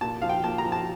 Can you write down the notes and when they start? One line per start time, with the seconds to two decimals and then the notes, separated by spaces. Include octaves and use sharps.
0.01 A#2 A5
0.22 F3 F5
0.29 G5
0.44 A#2 A5
0.58 A#5
0.65 F3
0.72 A5